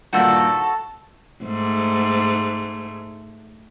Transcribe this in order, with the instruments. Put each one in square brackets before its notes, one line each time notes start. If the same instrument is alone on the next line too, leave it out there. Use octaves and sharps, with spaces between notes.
[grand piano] G2 A#2 D#3 [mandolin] F#4 A4
[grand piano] A5
[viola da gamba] G#2 A3